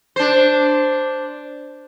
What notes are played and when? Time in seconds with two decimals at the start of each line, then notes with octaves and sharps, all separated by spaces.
0.16 D4 C5